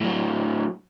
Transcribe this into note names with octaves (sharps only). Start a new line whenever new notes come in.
A2 F#3